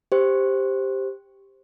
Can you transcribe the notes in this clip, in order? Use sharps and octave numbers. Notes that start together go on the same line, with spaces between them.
G4 C5